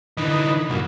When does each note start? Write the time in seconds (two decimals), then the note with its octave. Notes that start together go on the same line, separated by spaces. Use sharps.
0.17 D3 E3 D#4 B4
0.70 C2 F#2 A#2